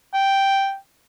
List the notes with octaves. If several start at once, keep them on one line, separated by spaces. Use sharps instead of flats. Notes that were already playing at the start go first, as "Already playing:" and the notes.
G5